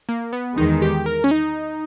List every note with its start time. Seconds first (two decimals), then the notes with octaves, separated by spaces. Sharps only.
0.09 A#3
0.33 B3
0.57 E2 D#3 G#3 D#4
0.82 G4
1.06 A#4
1.24 C#4
1.31 D#4